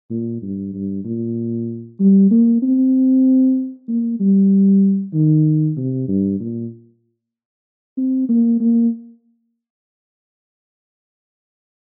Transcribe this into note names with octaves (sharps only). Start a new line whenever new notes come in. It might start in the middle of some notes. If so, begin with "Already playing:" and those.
A#2
G2
G2
A#2
G3
A#3
C4
A#3
G3
D#3
C3
G2
A#2
C4
A#3
A#3